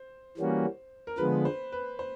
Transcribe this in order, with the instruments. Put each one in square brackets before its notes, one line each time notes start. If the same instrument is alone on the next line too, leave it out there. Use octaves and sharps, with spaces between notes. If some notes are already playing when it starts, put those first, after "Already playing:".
Already playing: [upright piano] C5
[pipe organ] E3 G3 A#3 C#4 F#4
[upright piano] A#4
[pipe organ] D3 F3 G#3 B3 [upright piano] B4
[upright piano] C5
B4
C5